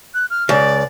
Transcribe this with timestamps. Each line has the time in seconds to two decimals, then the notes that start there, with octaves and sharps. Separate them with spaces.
0.14 F#6
0.30 F6
0.49 C#2 D5